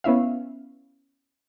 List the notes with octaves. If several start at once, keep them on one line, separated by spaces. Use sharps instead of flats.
B3 C#4 E4 E5 F5